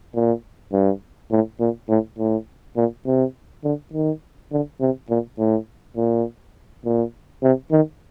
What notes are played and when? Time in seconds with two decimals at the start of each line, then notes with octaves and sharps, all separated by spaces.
0.14 A#2
0.72 G2
1.31 A2
1.60 A#2
1.89 A2
2.19 A2
2.76 A#2
3.06 C3
3.64 D3
3.93 D#3
4.52 D3
4.81 C3
5.09 A#2
5.38 A2
5.97 A#2
6.85 A#2
7.43 C3
7.71 D#3